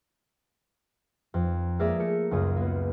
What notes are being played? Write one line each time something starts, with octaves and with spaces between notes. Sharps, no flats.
F2
G#3 A#3 G#4 A#4 D5 E5
A3 A#4 C#7
C#2 F#2 F4 G#5 D#6
A#3 B3